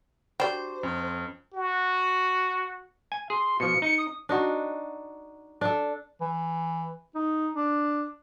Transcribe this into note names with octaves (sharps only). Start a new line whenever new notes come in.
D4 F#4 G4 C5 D5 G5
F2 C#4 B4 A#5
F#4
G#5
G#4 C6
B2 F3 C#7
D#4 C#7
D#6
D4 D#4 F#4
D4 A4
E3
D#4
D4